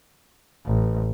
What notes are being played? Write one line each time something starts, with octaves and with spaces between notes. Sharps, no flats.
A1